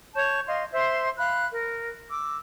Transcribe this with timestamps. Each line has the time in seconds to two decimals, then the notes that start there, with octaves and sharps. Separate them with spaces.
0.16 C#5 A5 C#6 G6
0.47 D#5 F5 C6
0.72 C5 E5 C6
1.17 F5 B5 F#6
1.53 A#4
2.11 D6 E6